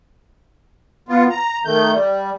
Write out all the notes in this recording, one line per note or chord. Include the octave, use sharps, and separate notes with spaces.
B3 F4
A#5
D#3 A3 G6
G3